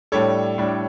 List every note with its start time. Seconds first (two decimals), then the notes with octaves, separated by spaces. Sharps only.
0.12 A2 G3 D4 A4 C#5
0.58 A2 G3 D4